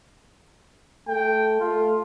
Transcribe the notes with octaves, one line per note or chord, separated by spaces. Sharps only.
A3 G5
A3 F4